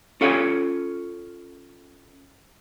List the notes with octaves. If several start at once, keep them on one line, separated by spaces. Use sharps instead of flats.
C#4 F4 A4 C#5 F5